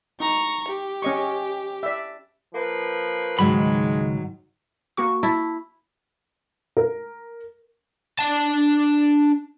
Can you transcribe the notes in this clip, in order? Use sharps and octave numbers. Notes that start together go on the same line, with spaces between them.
D#4 A#5 C#6
G4
C#4 D#5 C#6
D5 E5
F3 A#3 B4
C#2 G#2 D#3 F#3 G#3 B5
A#3 F#4 C#6
E4 A5
A#4
D4 A5